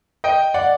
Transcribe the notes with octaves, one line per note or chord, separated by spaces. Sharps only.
D#5 G5
D5 F#5